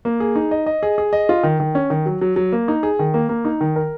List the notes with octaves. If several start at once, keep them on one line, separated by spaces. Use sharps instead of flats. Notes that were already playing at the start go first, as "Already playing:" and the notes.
A#3
G#4
D#4
D#5
D#5
G#4
G#4
D#5
F4
D#3
D#3
C#4
D#3
F#3
F#3
F#3
A#3
D#4
G#4
D#3
A#3
A#3
D#4
D#3
A#4